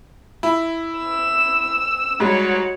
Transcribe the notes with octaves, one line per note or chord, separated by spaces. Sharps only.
E4
E6
G#2 G3 F#4 C#5